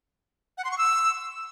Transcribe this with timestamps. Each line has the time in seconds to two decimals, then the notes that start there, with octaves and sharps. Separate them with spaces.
0.58 F#5
0.64 C6
0.71 C#6
0.78 E6